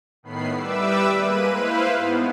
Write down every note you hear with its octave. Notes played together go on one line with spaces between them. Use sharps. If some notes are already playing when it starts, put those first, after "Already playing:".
A2 D#3 B3 B5 C7
G3 B4 E5 D6 E6
G#3 A#3 B4 D#7
E4 B4 C5 F5
G#2 B3